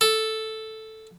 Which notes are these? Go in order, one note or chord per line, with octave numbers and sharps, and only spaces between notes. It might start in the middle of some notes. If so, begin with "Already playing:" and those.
A4